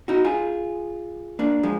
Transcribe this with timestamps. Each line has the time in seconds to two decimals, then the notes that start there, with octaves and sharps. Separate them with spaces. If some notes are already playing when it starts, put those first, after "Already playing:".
0.08 D#4 F#4
0.24 F4 G#4
1.39 A#3 D4
1.63 F3 G#3